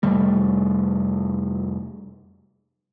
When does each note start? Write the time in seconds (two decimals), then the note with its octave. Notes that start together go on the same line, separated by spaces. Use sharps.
0.03 F2 C3 G3 A3